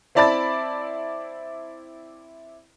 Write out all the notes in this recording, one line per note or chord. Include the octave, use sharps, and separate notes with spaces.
C4 E4 D5 A5 B5 A6